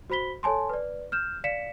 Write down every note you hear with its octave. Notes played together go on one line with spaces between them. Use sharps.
F#4 C5 B5 B6 G7
A4 C#5 G#5 A5 C6
B4 D5
F6 G6 E7
D5 F5 B6 C#7 E7